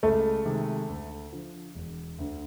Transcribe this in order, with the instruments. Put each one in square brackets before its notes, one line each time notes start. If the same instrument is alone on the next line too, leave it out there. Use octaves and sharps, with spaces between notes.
[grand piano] C#2 [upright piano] A3
[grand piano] C3 D#3 G#3
D2
D3 F3
E1
D2 D3